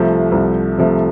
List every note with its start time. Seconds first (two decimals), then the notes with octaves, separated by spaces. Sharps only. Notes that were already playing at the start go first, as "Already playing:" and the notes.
Already playing: C2 C3 F3 A3
0.32 C2
0.78 C3 F3 A3